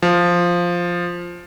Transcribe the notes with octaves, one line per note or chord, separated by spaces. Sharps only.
F3